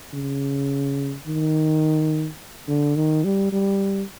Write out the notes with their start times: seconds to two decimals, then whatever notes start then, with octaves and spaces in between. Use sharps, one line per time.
0.14 C#3
1.27 D#3
2.68 D3
2.96 D#3
3.25 G3
3.53 G3